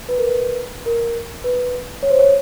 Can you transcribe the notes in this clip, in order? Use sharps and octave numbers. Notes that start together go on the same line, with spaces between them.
B4
A#4
B4
A#4
B4
C#5
C5
C#5